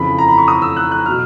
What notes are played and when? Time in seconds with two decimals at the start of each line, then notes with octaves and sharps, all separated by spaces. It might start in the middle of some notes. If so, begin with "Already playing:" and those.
Already playing: F2 C#3 E3 B5
0.18 A#5
0.28 B5
0.38 C#6
0.48 D#6
0.62 E6
0.76 F#6
0.91 F#6
1.06 B2 F#3 F6